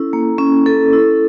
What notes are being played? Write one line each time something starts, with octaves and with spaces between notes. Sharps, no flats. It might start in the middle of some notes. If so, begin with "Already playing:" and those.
Already playing: C#4 E4 A4
A#3
C#4
A4
E4